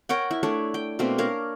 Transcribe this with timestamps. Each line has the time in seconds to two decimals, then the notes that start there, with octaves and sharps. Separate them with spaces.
0.09 A#4 C#5 F#5 G5
0.31 E4
0.43 A3 D4 C#5
0.74 G5
0.99 B2 A3 A#3 C4
1.18 D4 A#4 C#5 F5